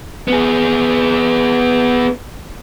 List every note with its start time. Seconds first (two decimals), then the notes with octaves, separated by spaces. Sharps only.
0.28 B3 G#4